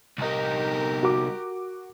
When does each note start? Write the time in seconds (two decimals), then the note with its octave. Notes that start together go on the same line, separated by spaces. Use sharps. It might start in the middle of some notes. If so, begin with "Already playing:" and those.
0.18 C2 D#4 G4 A#4
1.03 F#4 D6